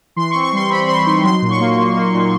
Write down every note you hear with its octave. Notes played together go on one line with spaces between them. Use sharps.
E3 C6
C#6
C4
C#6
G3 C6
C4 B5
C4 C6
D#4 C6
F#3 C6
A#2
C#6
A#3
A#3
A#3
A#2